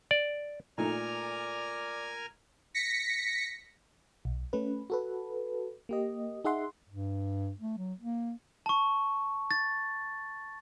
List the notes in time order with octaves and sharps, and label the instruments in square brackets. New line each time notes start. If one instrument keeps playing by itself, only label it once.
[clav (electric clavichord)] D5
[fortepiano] A#2 A3 D#4 [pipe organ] A#4 G#5 F6 [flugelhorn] D5
[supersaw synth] A#6 B6 C#7
[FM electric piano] B1
A3 C#4 B4
F#4 A4 B4
A#3 G4 D#5
D#4 G#4 E5 F#5 C6
[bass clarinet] G2
A3
F#3
A#3
[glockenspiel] A5 C#6
A6